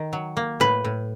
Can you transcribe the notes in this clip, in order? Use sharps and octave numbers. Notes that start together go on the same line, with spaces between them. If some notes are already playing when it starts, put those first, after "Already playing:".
Already playing: D#3
F#3
A#3
A2 B4
A2